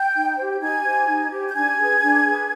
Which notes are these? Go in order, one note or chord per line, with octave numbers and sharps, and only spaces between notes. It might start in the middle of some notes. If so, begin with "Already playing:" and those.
Already playing: G5 G6
D#4
G4 C5
D#4 G#5 G#6
G4 C5
D#4
G4 C5
G6
D4 G#5 G#6
G#4 B4
D4
G#4 B4